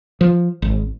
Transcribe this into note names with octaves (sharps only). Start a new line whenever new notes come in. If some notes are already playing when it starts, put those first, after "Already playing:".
F3
G#1